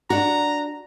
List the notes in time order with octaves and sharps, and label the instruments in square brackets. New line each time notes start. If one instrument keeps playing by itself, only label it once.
[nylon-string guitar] D4 F#4 [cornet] A#5